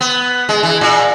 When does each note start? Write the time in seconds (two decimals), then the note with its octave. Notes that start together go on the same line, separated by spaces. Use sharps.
0.01 B3
0.49 G#3
0.63 E3
0.81 A#2